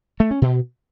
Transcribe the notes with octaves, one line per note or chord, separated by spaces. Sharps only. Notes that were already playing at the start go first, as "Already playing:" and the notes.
A3
C#4
B2